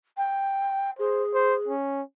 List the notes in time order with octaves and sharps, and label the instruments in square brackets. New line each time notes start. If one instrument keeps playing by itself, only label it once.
[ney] G5
[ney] G#4 [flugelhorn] C5
[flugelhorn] C5
C#4